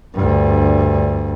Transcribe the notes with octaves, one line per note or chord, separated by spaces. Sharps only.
D2 G2